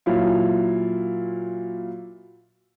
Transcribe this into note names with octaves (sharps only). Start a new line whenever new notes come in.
A#2 F#3 E4 F4